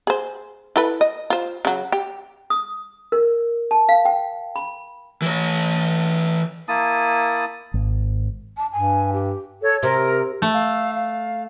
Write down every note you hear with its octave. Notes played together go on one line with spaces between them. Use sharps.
G#4 C5
E4 A4 B4
D#5
F4 C5
C#3 F#3
G4
D#6
A#4
A5
F5
G5
B5
E3 C#5
A#3 E4 A5 D#6
G#1
A5
G2 G#5
G4
A4 C#5
C3 A#4
A3
F5
F5